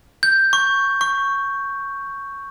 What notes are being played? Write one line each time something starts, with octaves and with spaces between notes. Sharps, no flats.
G6
C#6
C#6